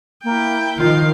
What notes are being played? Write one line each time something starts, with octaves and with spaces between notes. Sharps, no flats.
A#3 E4 G5
D#3 F3 F4 A#4 F5